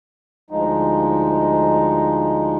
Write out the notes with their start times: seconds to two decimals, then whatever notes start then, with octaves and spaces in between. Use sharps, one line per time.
0.50 D2 F3 G#3 D#4